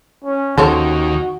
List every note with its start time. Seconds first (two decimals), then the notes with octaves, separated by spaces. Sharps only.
0.24 C#4
0.58 D#2 D#3 C#4 F#4 A4 C5 C#5